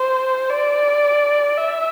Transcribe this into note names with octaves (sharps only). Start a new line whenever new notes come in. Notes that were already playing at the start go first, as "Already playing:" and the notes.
Already playing: C5
D5
E5